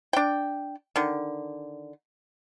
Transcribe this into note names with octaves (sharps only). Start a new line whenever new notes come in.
D4 G5
D3 D#3